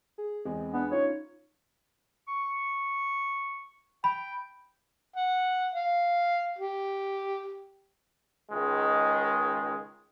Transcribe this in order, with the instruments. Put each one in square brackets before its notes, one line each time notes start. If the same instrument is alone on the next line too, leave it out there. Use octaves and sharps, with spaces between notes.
[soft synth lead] G#4
[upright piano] E2 G#3 [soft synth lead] C4
[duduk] B3 [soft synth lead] D4
[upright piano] C#4 F4 [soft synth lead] D#4 [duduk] C#5
[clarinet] C#6
[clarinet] G5 [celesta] B5
[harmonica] F#5
F5
G4
[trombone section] C#2 D#3 G#3